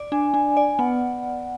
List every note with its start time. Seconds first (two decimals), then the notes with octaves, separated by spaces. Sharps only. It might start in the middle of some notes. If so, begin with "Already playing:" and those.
Already playing: D5
0.12 D4 G#5
0.34 D4 G#5
0.57 D5
0.79 B3 F#5